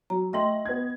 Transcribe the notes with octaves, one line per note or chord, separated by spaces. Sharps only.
F#3 A#5
A3 D#5 G5 C6 A#6 F#7
B3 G#6